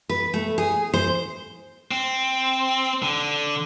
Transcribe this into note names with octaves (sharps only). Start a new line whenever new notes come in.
B4
A3
G#4
C5
C4
D3